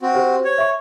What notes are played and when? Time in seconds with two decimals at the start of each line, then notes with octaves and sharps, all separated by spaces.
0.02 C4 F#4
0.15 G4 C5
0.45 C#5
0.58 E5 C#6